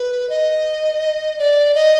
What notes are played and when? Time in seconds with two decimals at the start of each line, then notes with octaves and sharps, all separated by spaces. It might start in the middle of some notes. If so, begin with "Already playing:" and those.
Already playing: B4
0.29 D#5
1.39 D5
1.75 D#5